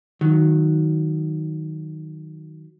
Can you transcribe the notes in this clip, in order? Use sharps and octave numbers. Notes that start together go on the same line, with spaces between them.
D#3 F#3